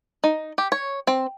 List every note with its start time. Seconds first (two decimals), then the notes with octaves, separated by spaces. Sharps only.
0.24 D#4
0.58 G4
0.72 C#5
1.07 C4